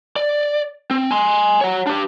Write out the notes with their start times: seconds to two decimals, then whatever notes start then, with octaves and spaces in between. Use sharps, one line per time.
0.16 D5
0.91 C4
1.11 G#5 C6
1.61 C#5 F#5
1.87 D4 G4